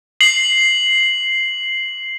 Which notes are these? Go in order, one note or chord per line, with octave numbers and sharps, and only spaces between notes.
C7 F#7